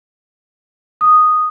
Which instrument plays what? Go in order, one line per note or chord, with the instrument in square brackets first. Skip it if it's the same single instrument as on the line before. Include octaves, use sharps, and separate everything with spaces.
[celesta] D#6